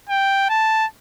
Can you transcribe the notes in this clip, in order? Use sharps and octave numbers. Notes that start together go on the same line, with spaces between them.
G5
A5